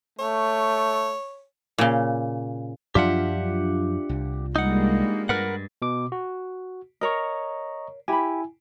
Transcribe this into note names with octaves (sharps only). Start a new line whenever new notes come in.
A3 C#5
A#2 C#3
F#2 F3 F#3 D4 F4 G4 E5 F#5
C2
G3 G#3 A#3 D#4 F#5
G2 A#4 B4 F#5
B2 D6
F#4
A#4 C#5 D#5 A#5 C#6
E4 G4 G#5 B5